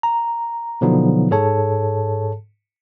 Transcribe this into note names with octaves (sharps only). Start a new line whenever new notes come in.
A#5
B2 D3 F3 F#3 B3 D#4
G#2 G#4 A4 C#5 A5